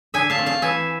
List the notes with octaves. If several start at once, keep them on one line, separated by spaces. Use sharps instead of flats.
D3 E5 G#5
F5 A5
A3 C4
F5 A5
E3 E5 G#5